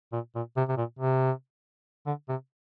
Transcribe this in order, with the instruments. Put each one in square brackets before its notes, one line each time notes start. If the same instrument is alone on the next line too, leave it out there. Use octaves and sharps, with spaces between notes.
[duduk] A#2
A#2
C3
C3
A#2
C3
D3
C3